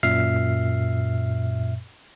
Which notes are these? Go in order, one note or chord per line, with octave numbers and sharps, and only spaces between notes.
F#2 A#2 E5 F6 C7